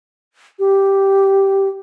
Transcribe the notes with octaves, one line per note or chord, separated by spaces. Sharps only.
G4